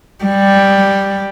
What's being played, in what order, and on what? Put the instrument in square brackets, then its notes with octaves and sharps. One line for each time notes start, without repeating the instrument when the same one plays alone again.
[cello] G3